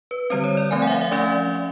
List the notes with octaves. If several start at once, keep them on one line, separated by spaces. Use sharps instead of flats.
B4
D3 G3 C4 C5
C#5
D5
F3 A3 C4 G#5
F#5
E5
F5
E5
F3 A3 C#4 D5